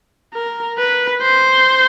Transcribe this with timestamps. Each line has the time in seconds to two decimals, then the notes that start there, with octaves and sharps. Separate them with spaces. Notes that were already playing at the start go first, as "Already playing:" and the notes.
0.34 A#4
0.78 B4
1.22 C5